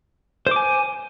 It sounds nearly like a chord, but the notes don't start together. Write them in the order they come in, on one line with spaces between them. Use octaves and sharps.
C5 D6 G#5